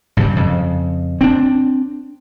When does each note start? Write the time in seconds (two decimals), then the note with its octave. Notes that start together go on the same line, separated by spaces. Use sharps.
0.17 G2 C#3 G3
0.36 F2 C#3
1.21 C4 D4